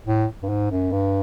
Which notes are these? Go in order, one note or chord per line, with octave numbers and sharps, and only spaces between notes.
A2
G2
G#2
F#2
G2